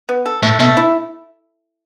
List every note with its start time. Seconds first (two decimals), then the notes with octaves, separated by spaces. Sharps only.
0.09 B3
0.26 A4
0.43 A2 A3
0.59 B2 A3
0.77 E4